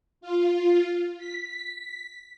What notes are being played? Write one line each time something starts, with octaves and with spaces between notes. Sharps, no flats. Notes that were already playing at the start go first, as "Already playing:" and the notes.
F4
B6